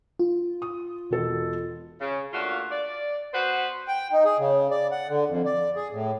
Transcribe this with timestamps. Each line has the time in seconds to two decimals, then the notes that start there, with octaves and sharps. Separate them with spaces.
0.19 F4
0.62 D#6
1.10 E1 B2 A4
2.00 C#3
2.32 A3 A#3 D4 F4 F#4
2.71 D5
3.33 B3 F#4 B4 C5
3.88 G5
4.12 D#4
4.25 G#4
4.39 C#3
4.71 D5
4.91 F#5
5.09 D3
5.29 F2
5.45 D5
5.76 G#4
5.92 A2